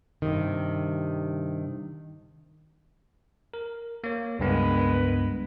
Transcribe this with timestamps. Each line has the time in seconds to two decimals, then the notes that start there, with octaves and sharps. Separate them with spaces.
0.22 G2 C3 D#3
3.54 A#4
4.04 A#3 C#5
4.39 C#2 G2 G#3 B3 A#4 B4